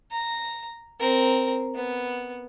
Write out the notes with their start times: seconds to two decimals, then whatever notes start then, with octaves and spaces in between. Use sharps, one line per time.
0.11 A#5
1.00 C4 A#4
1.75 B3